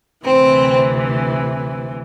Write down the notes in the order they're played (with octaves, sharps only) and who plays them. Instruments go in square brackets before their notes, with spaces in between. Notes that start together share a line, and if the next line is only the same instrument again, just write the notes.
[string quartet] D2 C3 E3 C4